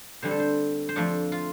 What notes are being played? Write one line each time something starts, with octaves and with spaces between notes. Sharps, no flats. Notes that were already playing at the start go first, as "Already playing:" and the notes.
D3 G3 C4 C5
A4
C5
C5
F2 F3 A3 D4 A4
F4